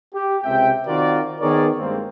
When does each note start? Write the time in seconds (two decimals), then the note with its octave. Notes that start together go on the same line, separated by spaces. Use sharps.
0.14 G4
0.44 C#2 C3 C4 E5 G5
0.86 D#3 C4 F4 F#4 A#4 D5
1.40 D#3 B3 G#4 A#4 C#5 D5
1.78 G2 G#3 A#3 C4